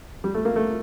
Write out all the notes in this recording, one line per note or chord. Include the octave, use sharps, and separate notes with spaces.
G3
A3
A#3
A3